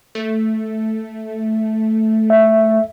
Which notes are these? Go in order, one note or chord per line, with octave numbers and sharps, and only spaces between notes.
A3
E5